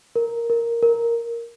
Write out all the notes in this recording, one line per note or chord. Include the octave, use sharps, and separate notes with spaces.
A#4
A#4
A#4